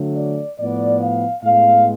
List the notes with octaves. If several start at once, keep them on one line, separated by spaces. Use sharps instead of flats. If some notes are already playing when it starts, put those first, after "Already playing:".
Already playing: D3 F#3 A3
D5
A2 F3 B3 D5
F5
A2 G#3 B3 F5